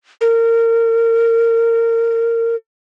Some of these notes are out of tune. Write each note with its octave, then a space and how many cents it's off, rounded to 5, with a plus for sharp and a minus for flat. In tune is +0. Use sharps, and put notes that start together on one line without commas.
A#4 -25